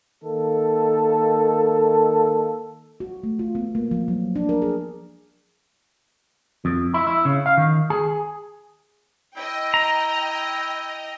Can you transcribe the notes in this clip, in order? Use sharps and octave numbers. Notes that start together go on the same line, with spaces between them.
D#3 A#3 A4
F#4
A3
F4
B3
A#3
F3
F#3
D4
A#4
G#4
F2
E4
E4
C#3
F5
D#3
G#4
E4 D#5 G5
A#5